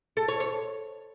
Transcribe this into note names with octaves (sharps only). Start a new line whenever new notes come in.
A4
C#5
C#5